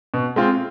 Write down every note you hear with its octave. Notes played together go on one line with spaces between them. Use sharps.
B2
G#3 C4 F4